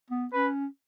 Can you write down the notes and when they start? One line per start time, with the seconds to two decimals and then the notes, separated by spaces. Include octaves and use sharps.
0.10 B3
0.33 C#4 B4